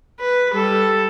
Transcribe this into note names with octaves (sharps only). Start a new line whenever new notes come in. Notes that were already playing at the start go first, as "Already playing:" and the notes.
B4
G3 A4